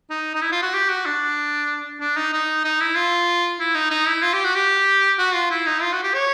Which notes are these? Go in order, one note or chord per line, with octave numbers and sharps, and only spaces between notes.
D#4
D#4
E4
F4
F#4
G4
F#4
D4
D4
D#4
D#4
D#4
E4
F4
E4
D#4
D#4
E4
F4
G4
F#4
G4
F#4
F4
E4
D#4
F4
F#4
G4
C#5